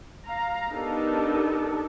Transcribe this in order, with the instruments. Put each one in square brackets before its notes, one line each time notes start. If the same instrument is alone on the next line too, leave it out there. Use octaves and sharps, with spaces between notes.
[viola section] F5 A#5
B3 D4 D#4 G4 A4 A#4